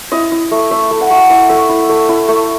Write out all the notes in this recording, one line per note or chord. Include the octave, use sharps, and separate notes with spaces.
E4 D#5
E4
A3
A3 E5
A3
F#5
A3
E4 E5
A3 E5
E4
A3
E4
A3